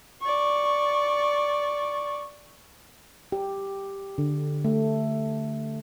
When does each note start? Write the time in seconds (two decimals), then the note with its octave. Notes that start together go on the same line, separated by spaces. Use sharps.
0.22 D5 C#6
3.32 G4
4.18 D3
4.65 A3